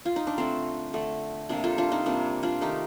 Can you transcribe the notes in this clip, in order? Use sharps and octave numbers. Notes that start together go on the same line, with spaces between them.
F4
D#4
D4
D3 A3 C4
D3 A3
C3 G3 A#3 D4
F4 A4
D4 F4
C4 D#4
C3 G3 A#3 D4
D4 F4
D#3 A3 D#4 G4